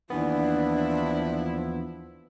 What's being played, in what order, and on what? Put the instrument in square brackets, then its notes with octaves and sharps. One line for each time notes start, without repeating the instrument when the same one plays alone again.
[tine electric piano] D#2 E3 B3 [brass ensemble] F3 E4 [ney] D4